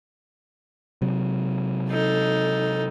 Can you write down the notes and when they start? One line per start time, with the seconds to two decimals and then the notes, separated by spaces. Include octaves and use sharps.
1.02 C3 F#3
1.90 D#4 A4